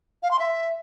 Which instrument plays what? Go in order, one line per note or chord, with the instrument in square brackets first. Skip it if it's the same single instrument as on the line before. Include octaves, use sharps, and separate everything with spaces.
[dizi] F5
C6
E5